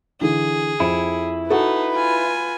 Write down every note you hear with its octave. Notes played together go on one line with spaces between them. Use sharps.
D3 E3 G#4
F2 E4
D#4 F#4 A4 B4
F4 G#5